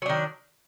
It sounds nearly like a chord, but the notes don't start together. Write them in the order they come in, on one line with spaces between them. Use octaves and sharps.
F#3 D4 D#3